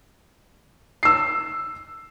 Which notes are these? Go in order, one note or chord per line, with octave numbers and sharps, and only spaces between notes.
E6 C7